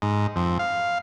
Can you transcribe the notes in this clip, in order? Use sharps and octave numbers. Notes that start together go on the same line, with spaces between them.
G#2
F2
F5